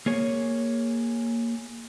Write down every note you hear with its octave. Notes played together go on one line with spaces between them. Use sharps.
A#3 G#4 C#5